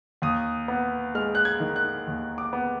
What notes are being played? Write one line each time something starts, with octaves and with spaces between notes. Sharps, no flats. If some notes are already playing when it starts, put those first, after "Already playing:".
D#2 D#6
B3
G#3 F6
F#6
G#6
D#3
F#6
D#2
D6
B3